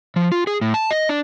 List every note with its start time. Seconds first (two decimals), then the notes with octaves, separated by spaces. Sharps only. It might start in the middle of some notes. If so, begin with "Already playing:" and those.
0.16 F3
0.32 F4
0.47 G#4
0.61 A2
0.74 A5
0.91 D#5
1.09 D4